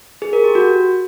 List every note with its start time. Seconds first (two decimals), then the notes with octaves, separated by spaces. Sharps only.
0.22 G#4
0.33 A#4
0.44 G4
0.55 F#4